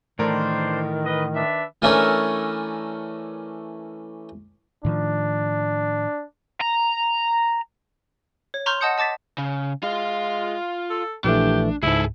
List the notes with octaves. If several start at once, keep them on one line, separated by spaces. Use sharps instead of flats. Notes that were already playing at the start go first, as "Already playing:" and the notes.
A2 D#3 E3 A3 D4 A#4 C5 D5
B4 D#5
D4 B4 E5
E3 A3 C#4 D4 A#4 C#5
A2 D#3 F3 D4
A#5
C#5
A#5 C6 C#6 F6 G6
D#5 F#5 A5 D#6 G6 C#7
D#5 A5 D6 A6 B6
C#3
G#3 F4 F5
A4
A#1 E3 A3 D4 G4
C#2 G#2 E4 G#4 A4